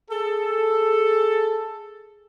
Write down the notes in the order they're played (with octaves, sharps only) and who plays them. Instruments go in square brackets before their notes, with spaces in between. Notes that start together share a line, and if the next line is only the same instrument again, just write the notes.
[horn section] G#4 A4